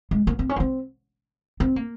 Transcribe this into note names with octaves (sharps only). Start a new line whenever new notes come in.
G#3
A#3
C4
C#4
A#3
C4
C4
A#3